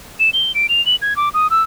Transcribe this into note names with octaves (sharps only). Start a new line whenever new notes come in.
E7
G7
D7
F7
F#7
G#6
D6
D#6
E6